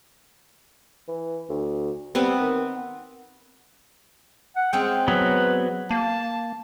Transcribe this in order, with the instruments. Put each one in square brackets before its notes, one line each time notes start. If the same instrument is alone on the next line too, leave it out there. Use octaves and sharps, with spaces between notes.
[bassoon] E3
D2
[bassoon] G3 [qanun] B3 C4 B4
[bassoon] D#3
[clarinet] F#5
[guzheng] G#3 C4 C#4 [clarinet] G5
[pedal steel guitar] F#3 B3 [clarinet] B4
[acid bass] A#3 [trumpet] A5